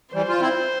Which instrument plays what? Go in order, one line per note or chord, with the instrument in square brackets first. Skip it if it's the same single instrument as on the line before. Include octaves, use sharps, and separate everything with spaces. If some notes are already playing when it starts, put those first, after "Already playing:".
[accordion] E3 G3 [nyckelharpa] C5
[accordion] F4
C4 E4